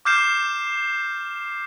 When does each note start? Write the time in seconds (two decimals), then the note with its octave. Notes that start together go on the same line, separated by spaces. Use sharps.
0.05 D6 F6 G6 C7 E7